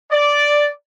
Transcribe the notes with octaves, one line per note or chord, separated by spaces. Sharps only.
D5